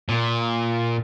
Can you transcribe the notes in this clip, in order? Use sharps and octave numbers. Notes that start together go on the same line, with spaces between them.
A#2